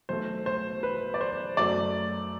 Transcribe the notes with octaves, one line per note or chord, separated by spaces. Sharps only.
B1 B2 A3 C5
C5
B4
D5
C5
F#2 F#3 A3 D5